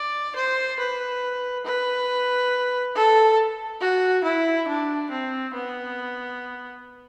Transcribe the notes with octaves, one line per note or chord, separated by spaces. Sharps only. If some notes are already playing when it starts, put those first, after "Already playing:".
Already playing: D5
C5
B4
B4
A4
F#4
E4
D4
C4
B3